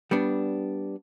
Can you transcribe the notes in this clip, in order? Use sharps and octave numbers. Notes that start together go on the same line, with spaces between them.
G3 B3 D4